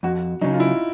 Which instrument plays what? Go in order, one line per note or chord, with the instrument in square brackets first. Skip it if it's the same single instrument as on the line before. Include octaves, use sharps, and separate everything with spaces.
[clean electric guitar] F2 [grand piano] F#4
[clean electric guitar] C#3 F#3 [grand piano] D#4
[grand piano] F4
E4